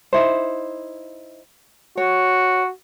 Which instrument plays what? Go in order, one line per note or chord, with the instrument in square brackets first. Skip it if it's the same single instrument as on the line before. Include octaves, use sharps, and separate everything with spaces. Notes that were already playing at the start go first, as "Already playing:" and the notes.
[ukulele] D#4 E4 C5
[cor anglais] F#4 [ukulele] C#5